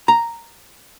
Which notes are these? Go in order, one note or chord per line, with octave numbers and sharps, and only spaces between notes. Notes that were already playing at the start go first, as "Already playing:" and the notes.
A#5